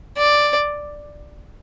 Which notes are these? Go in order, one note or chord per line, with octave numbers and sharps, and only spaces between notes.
D5